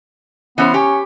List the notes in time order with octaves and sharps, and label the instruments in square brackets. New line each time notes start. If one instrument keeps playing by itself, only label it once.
[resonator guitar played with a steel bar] E3 C#4 C5 [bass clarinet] B3
[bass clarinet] C#4 [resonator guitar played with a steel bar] G4